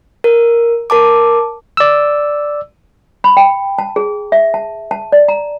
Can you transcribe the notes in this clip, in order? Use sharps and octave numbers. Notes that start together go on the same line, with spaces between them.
A#4
A#4 A5 D6
D5 E6
B5
G5
A5
G#4
E5
A5
A5
D5
A#5